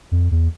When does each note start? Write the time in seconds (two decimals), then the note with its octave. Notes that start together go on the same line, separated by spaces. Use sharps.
0.12 F2
0.31 E2